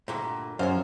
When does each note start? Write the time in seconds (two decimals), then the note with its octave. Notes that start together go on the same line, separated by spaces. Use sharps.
0.08 D2 G2 A#2
0.59 F#2 C5 C#5 F5